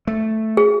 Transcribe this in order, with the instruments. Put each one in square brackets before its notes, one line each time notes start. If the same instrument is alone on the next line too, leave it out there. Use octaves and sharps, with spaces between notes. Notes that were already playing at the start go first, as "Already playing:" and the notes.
[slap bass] A3
[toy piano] G#4